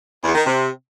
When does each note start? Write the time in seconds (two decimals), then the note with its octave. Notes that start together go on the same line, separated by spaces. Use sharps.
0.24 E2
0.35 D#3
0.46 C3